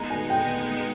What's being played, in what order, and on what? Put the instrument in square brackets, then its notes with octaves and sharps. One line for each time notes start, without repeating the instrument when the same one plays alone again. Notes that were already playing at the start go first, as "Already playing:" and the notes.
Already playing: [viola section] G#3 B3 D#4 [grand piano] A#5
[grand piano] G#5
G5